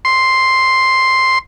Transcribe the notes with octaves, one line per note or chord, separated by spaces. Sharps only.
C6